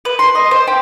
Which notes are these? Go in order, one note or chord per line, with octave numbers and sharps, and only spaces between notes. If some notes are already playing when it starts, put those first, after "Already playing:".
B4
C6
D#5
C5
G4